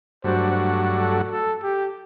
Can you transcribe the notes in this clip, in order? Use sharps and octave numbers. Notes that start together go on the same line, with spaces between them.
G2 F#3 A3 D4 F#4 C5
A4
A4
G4